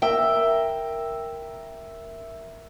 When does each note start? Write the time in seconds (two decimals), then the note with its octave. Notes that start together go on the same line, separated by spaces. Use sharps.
0.02 A#4 E5 G5